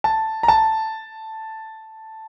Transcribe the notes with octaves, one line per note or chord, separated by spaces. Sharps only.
A5
A#5
A5